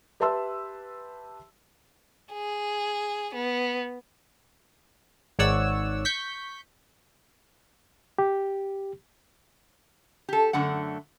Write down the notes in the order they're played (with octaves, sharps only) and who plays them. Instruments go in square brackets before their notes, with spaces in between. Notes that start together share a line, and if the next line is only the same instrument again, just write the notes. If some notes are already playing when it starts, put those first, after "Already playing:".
[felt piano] G4 B4 E5 A5 C6 E6
[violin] G#4
B3
[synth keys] G#1 G#2 C#5 D5 F#5 E6
C#6 G6 B6
[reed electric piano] G4
[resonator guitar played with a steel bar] G4 A4
F#2 D3 A3 F#5